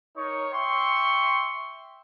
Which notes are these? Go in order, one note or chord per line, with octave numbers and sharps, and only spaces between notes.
D#4 A#4 C#5 C#6
E5 G5 C6 C#6